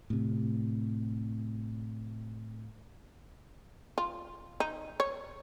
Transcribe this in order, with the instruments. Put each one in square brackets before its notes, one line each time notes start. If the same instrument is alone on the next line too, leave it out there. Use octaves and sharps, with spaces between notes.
[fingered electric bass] A2 C3
[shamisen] F4
D#4
C#5